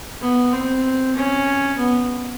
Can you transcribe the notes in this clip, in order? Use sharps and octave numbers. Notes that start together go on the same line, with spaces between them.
B3
C4
C#4
B3